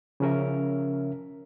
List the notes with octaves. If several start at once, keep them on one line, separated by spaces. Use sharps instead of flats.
C#3 F3 C#4 A#4 E5